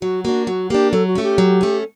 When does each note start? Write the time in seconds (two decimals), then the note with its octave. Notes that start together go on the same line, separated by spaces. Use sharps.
0.01 F#3 F#4
0.24 A#3 D4 F#4
0.47 F#3 F#4
0.70 A#3 D4 G4
0.92 F#3 A4
1.07 F#4
1.15 A3 C#4
1.23 G4
1.38 F#3
1.61 A3 C#4